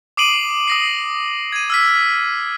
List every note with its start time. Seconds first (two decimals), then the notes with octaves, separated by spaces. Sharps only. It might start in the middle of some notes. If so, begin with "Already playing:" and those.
0.17 D6 D#6 C7 D7 D#7 F#7
0.68 D#6 A#6 C7
1.52 G#6 D#7
1.70 E6 F6 B6